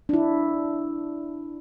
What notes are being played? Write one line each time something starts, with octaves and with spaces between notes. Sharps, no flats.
D4 E4